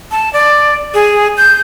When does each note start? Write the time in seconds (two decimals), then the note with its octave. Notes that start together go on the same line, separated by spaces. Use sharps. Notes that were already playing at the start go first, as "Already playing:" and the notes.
0.11 A5
0.33 D5
0.94 G#4
1.37 G6